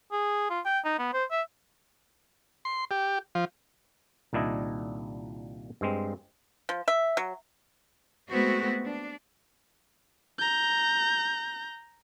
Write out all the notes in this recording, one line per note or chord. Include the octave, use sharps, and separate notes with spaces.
G#4
F4
G5
D#4
B3
C5
E5
C6
G4
F3
C2 A#2 D#3 D4 E4 D#5
G2 G#3 C4
F3
E5
F#3
G#3 A3 B3 C4 F#4
D4
A#5 G6